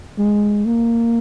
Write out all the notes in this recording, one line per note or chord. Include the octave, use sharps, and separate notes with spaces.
G#3
A#3